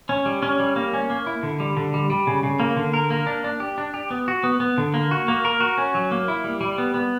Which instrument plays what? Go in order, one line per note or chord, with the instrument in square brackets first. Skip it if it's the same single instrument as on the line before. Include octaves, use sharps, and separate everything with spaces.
[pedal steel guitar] C#4
G3
C#4
G3
A#3
C#4
A#3
E4
D3
G3
D3
G3
G3
C#3
C#3
A#3
D3
A#4
A#3
D4
D4
G4
D4
G4
B3
F#4
B3
B3
D3
A#3
F#4
A#3
A#4
F#4
C#4
F#3
A#3
E4
G3
G3
B3
B3